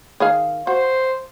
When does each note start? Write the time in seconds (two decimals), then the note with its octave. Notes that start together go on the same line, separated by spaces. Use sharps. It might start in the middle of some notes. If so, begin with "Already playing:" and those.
0.20 D#3 G#4 F5
0.67 F#4 C5